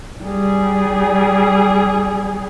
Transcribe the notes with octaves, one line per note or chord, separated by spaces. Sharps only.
G3 G#4